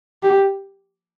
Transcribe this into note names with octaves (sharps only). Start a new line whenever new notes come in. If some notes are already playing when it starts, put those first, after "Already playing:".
G4